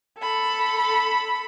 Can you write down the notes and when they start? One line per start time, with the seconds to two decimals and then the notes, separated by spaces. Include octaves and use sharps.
0.18 A4 B5